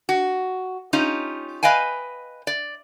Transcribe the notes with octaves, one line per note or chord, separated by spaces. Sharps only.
F#4
C#4 D#4 F4 G4
B4 D#5 F5 G5 G#5
D5